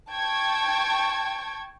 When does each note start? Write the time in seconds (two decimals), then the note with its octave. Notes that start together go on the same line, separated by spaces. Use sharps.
0.12 G5 A5 C#6 G#6